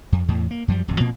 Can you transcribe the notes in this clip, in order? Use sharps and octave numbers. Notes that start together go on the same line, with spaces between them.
F2
E2 A2
A#3
F#2 F3 G3
D1 F2
A#2 F3 A#3 C4